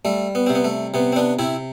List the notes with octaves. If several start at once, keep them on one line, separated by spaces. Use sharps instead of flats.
G3 A3
B3
C3 C4
B3
A3
C3 B3
C4
B3 D4
C3 C4 E4